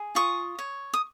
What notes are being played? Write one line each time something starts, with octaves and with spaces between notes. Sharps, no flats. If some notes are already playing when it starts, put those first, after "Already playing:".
Already playing: G#4
F4 C#6 D#6
C#5
D#6